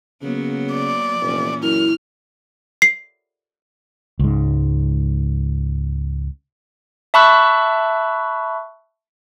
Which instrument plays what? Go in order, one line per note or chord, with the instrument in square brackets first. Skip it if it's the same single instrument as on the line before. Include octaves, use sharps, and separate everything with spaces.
[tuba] C#3 [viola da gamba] F#3 A#3 B3
[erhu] D5
[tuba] F1 [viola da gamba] A#2 E3 C#4
[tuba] F#2 [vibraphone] E4 [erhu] F6
[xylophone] C7
[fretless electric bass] C#2 G#2
[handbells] E5 A5 B5 C#6 E6 F#6